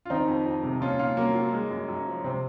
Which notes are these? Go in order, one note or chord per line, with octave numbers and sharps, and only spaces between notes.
F4
D#3 C4 D#4
F2
F2
C3
A#2 C#4 F4
A#2 C#4 F4
F#3 A#3 C#4
F#3
G#3
F#2
F#2
F3
C3 C4